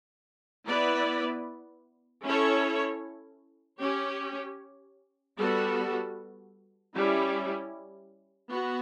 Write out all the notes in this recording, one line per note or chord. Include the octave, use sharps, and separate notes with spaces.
B3 E4 B4 D5
C#4 E4 A4 C#5
C#4 G4 C#5
G3 B3 F#4 A4
G3 C#4 E4
B3 F#4